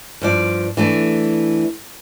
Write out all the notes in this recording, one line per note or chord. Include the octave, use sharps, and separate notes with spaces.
G2 F3 D5
E3 A3 D4